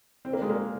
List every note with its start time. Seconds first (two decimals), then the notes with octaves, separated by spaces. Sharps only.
0.25 C4
0.33 A#3
0.42 G#3
0.50 A#3